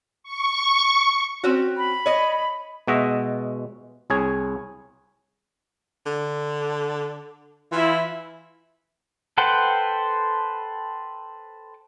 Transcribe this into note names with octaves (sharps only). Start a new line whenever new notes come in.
C#6
C4 C#4 F#4
B5
C#5 D#5
B2 G#3 F#4 D#5 E5
C2 G#4 C#5 G#5
D3
E3 E4 F4
A4 B4 C5 F#5 G5